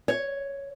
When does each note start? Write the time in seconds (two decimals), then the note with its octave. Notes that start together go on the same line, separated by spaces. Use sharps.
0.08 C#5